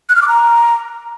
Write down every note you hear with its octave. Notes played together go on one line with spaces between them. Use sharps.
F#6
F6
D6
A#5